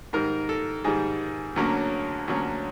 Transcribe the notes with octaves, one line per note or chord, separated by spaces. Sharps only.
G#2 D#3 G3 A#4
A4
G#2 D#3 G3 G#4
D2 D3 F#3 A#3 C#4
D2 D3 F#3 A#3 C#4